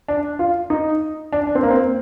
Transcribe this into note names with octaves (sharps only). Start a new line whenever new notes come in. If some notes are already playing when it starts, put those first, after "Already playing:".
D4
F4
D#4
D4
D4
C4
A#3
C4